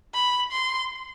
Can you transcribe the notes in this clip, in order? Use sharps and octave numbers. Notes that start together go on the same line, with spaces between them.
B5
C6